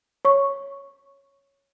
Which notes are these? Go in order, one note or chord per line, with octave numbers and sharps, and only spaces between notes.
C#5 C#6